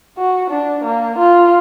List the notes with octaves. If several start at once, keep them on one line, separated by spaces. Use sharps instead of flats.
F#4
D4
A#3
F4